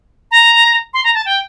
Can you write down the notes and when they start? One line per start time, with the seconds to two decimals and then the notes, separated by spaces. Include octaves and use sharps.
0.31 A#5
0.94 C6
1.04 A#5
1.14 A5
1.26 G5